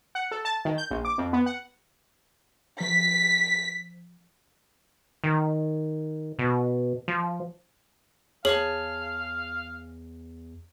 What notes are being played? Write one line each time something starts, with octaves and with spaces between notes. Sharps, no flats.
F#5
A4
A5
D#3
G6
A#1
D6
F2
B3
F#5
F3 B6
D#3
B2
F3
E2 G#4 C#5 F5 A5 F#7